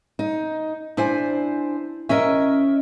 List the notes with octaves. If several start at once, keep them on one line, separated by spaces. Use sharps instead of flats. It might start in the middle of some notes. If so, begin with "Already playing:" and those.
D#4
D4 E4 C5 G#5
C#4 A#4 D#5 E5